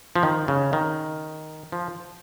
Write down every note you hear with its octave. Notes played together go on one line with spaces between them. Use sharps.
F3
D#3
C#3
D#3
F3